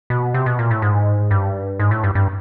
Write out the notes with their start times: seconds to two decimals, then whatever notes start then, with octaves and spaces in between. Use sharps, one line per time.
0.10 B2
0.34 C3
0.46 B2
0.59 A#2
0.71 A2
0.82 G#2
1.31 G2
1.80 G#2
1.91 A2
2.04 G2
2.15 G2